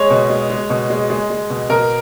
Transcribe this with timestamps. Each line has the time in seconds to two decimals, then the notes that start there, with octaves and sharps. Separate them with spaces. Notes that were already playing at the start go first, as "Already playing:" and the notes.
Already playing: G#3 C#5
0.10 B2
0.30 G#3
0.50 G#3
0.70 B2
0.90 G#3
1.10 G#3
1.30 G#3
1.50 B2
1.70 B2 A#4